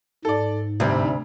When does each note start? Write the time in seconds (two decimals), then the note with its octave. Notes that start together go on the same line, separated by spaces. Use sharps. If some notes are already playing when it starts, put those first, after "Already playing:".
0.25 G#2 A4 D5
0.80 D2 C3 G3 C4